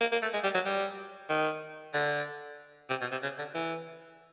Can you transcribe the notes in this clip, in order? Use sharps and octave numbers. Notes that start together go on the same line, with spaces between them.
A#3
A#3
A3
G#3
G3
F#3
G3
D#3
D3
C3
B2
C3
C#3
D3
E3